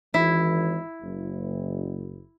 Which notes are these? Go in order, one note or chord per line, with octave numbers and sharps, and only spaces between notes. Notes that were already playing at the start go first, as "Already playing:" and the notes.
G#1 E3 E4
F#1